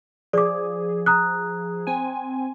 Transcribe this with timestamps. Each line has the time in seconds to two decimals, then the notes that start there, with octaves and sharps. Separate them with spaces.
0.33 F3 G#4 D5 D6
1.06 A#5 D#6 F#6
1.87 C4 G#5